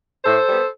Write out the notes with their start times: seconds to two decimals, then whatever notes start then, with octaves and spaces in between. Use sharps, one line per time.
0.25 A2 A4 C5
0.47 G3 B3